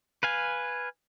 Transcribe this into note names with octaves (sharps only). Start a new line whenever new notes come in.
B4 F5 G#5